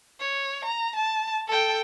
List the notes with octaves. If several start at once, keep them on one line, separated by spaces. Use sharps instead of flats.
C#5
A#5
A5
A4 G5